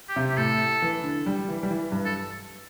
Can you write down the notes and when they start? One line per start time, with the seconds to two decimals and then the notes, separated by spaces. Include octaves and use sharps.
0.09 G4
0.16 C3
0.30 G4
0.37 A2 A4
0.82 E3
1.03 D3
1.26 G3
1.48 E3
1.63 G3
1.71 E3
1.92 G2
2.06 A4